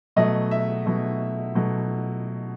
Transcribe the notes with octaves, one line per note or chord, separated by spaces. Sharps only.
B2 F#3 A3 D#5
E5
B2 F#3 A3
B2 F#3 A3